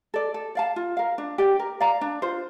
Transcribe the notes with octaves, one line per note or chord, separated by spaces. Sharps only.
A4 D5
A4
D5 F5 A5
F4
A#4 F5
D4
G4 D5 G5
A#4
D5 F5 A#5
D4
F4 C5